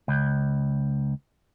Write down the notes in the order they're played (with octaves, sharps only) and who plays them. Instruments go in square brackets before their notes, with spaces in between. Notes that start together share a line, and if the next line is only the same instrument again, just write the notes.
[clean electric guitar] C#2